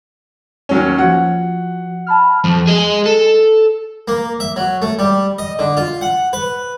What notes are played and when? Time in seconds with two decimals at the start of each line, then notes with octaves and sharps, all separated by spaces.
0.69 D#2 F#3 C#4
0.99 F3 F#4 F#5
2.07 A5 B5 F6
2.44 F2
2.67 G#4 D#5
3.06 A4
4.08 A#3
4.40 E5
4.56 F#3
4.82 A3
4.99 G3
5.38 D#5
5.59 D3
5.77 F4
6.01 F#5
6.33 B4